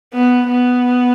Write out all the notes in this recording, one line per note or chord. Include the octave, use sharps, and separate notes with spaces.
B3
B3